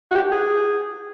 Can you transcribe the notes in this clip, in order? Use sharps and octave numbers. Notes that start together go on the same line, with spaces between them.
F#4
G4
G#4